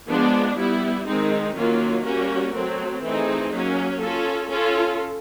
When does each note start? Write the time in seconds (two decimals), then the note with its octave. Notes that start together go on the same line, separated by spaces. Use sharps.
0.09 F3 G#3 B3 D4
0.58 G3 B3 E4
1.07 D#3 G#3 C4 D#4
1.56 D#3 F#3 A#3 C#4 F4
2.04 G3 A#3 C#4 F#4 A#4
2.54 F#3 A3 C4
3.03 E3 A3 C4 D#4 G#4
3.52 F#3 A#3 C#4
4.01 C#4 F4 A4
4.50 C#4 F4 A4